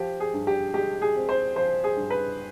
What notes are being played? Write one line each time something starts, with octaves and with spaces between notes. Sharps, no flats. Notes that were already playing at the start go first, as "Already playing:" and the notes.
Already playing: F3 G4
G#4
G2
G4
G#3 G4
G#4
C4
C5
F3 C5
G#4
G2
B4